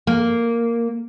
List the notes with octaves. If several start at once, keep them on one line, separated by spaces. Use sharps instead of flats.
A#3